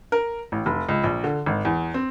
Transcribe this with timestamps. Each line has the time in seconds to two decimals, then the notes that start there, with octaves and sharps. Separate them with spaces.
0.12 A#4
0.52 A1
0.66 F1
0.89 C#2
1.04 A#1
1.24 D3
1.46 G#1
1.65 E2
1.94 C4